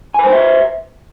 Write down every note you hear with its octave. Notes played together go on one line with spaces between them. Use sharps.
B4 C5 E5 G5 G#5